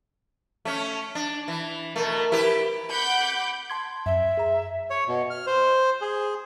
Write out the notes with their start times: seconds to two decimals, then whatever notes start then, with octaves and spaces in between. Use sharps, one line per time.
0.65 A3 C#4
1.15 D4
1.48 E3
1.96 B2 A3 A#4
2.32 E4 G4 B4
2.91 F#5 B5 D6 G6
3.70 A5 C6 G#6
4.06 F#2 E5
4.37 G#4 A#5
4.90 C#5
5.08 B2
5.30 F6
5.47 C5
6.01 G#4